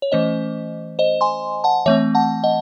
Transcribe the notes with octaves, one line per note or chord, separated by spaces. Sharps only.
C#5
E3 A3 C#4 C5 D#5
C5 D#5
G#5 C6
F#5 A5
E3 A3 C4 C#5 E5
F#5 A5
D#5 F#5